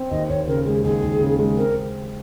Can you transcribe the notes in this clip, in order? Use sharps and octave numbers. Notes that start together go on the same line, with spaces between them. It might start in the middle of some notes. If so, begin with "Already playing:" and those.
Already playing: C4
D#2 D#5
D#2 C#5
C#3 A#4
G#3 G#4
D#2 G#4
D#2
C#3
G#3
C4 A#4